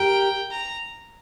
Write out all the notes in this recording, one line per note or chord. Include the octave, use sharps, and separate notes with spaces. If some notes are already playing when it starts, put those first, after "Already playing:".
Already playing: G4 A#4 G5
A#5